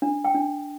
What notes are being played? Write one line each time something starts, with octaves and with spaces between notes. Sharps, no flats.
D4
G5
D4